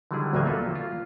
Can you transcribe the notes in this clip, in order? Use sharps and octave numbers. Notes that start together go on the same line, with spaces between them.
D3 D#3 F#3 G3 E4 G#4
D2 A2 F#3 G3 A#3 G#5
A#3 F4 A4 B4
F4